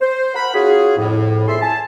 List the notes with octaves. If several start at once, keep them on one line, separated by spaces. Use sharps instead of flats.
C5
A#4 F#5 B5
C#4 F4 F#4 G#4
F2 A2
E2 A2 G#4 A4 E5 C6
G#5 A5